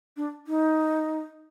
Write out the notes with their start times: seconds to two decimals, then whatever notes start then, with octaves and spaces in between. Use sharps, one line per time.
0.17 D4
0.47 D#4